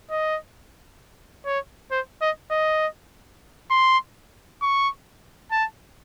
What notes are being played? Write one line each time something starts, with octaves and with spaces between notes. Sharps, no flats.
D#5
C#5
C5
D#5
D#5
C6
C#6
A5